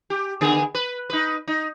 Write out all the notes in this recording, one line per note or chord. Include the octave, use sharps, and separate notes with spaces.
G4
D3 B3 G#4
B4
D#4 B4
D#4